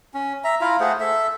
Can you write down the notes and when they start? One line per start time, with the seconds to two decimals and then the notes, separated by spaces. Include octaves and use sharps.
0.14 C#4
0.44 E5 A#5
0.61 E4 F4 F5 A#5
0.80 A3 G#4 C5 F#5
1.00 A4 E5